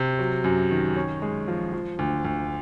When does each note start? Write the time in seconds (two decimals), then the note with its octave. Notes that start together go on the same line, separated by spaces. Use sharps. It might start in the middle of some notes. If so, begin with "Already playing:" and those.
Already playing: C3
0.19 F#3
0.44 F#2
0.71 D#3
0.96 C#4
1.22 G#3
1.48 F3
1.73 F3
1.99 D2
2.25 D2